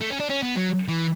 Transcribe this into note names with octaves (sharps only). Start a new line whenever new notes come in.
A3
C#4
D4
C#4
B3
F#3
E3